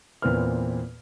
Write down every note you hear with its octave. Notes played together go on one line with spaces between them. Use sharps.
E2 A#2 C4 B4 F6